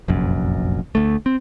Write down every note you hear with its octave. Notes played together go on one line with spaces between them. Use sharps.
F1 A#1 F#2
D2 A3
C4